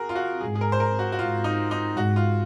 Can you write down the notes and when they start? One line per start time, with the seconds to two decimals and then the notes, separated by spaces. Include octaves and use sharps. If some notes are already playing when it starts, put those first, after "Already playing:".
Already playing: F#4 G#4 A#4
0.09 F4
0.15 F#4
0.41 G#2 G#4
0.55 G#4
0.61 A#4
0.72 C5
0.80 A#4
0.99 F#4
1.12 F#4
1.18 G#2 F4
1.44 D#4
1.71 D#4
1.96 G#2 F#4
2.16 F4